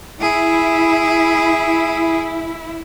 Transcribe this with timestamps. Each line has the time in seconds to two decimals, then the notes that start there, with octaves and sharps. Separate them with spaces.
0.22 E4 G#4